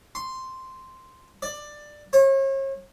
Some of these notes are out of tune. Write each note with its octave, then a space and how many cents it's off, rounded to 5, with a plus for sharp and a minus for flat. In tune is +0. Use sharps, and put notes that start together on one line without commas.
C6 -5
D5 +15
C#5 -40